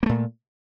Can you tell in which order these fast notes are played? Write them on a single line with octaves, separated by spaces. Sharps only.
A#3 A3 A#2